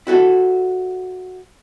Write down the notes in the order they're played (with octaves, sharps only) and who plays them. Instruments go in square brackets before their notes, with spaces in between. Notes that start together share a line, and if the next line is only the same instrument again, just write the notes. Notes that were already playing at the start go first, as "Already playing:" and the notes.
[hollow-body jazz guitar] E4 F#4 A4